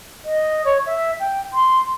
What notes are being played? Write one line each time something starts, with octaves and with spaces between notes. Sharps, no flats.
D#5
C#5
E5
G5
C6